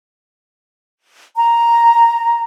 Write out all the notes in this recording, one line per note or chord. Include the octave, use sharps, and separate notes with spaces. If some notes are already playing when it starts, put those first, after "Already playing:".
A#5